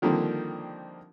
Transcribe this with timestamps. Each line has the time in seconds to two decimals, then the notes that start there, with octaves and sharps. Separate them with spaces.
0.02 D3 D#3 F3 G3 A#3 C4